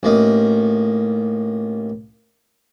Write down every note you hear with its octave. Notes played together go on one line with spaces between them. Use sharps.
A1 A#3 D#4